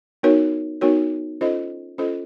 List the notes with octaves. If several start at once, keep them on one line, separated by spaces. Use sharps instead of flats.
B3 D#4 F#4 A#4 C#5
B3 D#4 F#4 A#4 C#5
C#4 F4 A4 C5 D#5
C#4 F4 A4 C5 D#5